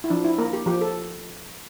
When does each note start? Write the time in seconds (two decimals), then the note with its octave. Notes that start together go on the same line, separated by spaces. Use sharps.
0.04 E4
0.10 F3 D4
0.24 E4
0.38 A#3 A#4
0.53 G4
0.66 F3 G4
0.81 A4